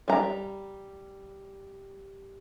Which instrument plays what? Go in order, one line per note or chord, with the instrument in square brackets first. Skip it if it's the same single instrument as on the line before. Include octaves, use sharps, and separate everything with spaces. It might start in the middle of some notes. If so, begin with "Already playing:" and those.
[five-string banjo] G3 A#5